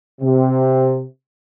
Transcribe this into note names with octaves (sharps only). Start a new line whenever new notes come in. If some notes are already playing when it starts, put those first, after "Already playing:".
C3